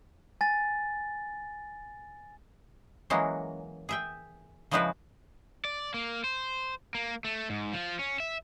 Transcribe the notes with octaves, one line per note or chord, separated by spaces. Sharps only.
G#5 A6
E3 F#3 G#3 A#3 C#4
G#4 E5 G5
C#3 F3 G#3 E4 F#4 B4
D5
A#3
C5
A#3
A3
G#2
F3
C#4
E5